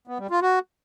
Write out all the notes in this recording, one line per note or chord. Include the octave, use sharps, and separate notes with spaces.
B3
G3
F4
F#4